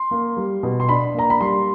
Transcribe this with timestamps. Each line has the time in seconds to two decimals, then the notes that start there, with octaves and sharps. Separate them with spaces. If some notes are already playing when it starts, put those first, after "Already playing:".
Already playing: C6
0.11 A#3
0.37 G3
0.63 B2
0.80 C6
0.89 D4 B5
1.14 A#3 A#5
1.30 B5
1.40 G3 C6